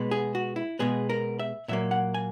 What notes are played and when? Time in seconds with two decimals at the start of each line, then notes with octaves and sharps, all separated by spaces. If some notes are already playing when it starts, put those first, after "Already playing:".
Already playing: B2 G#3 B3
0.11 G#4
0.35 F#4
0.56 E4
0.79 B2 G#3 B3 G#4
1.09 A#4
1.39 E5
1.68 A#2 F#3 A#3 E5
1.91 F#5
2.14 G#5